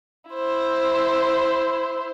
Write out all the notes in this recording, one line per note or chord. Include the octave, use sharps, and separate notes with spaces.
E4 C5